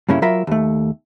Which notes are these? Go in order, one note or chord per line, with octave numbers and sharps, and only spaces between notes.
G2 C#3 A#3 C#4 E4
F#3 F4 A#4 E5 B5
D#2 A3